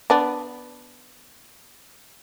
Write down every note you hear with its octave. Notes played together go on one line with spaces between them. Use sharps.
B3 D4